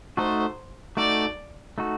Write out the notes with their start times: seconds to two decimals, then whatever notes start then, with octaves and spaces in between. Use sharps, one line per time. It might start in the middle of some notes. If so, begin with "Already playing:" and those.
0.17 A3 D#4 F#4 A4 C5
0.97 A3 D#4 F#4 A4 D5
1.78 A3 D#4 F#4 A4